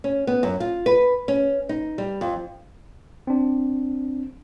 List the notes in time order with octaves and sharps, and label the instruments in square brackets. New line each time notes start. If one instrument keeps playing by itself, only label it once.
[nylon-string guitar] C#4
B3
F#2
F4
B4
C#4
D#4
G3
F2
[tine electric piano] C4 D4